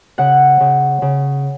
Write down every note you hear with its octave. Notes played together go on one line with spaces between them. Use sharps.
C#3 F#5
C#3
C#3